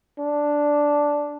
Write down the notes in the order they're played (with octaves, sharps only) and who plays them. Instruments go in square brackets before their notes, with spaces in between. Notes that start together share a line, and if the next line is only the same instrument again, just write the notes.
[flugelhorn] D4